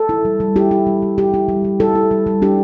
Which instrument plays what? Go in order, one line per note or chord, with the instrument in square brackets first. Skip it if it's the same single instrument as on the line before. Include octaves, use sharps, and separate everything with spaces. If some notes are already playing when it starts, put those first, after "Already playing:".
Already playing: [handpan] A4
E4
G3
G3
E4 G4
E4
G3
G3
E4 G4
E4
G3
G3
E4 A4
E4
G3
G3
D4 G4